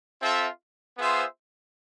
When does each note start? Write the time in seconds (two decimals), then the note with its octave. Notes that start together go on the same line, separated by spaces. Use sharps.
0.21 C4 F4 A4 E5
0.98 B3 F4 G#4 C5 E5